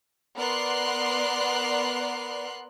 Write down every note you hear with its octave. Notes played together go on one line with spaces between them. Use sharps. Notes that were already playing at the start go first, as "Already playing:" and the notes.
B3 A#4 D5 C6 F#6 C7